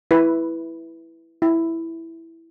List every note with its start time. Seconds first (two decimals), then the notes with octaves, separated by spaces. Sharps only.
0.11 E4 B4
1.42 E4